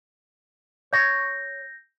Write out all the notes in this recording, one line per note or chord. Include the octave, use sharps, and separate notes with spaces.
C#5 G6 A#6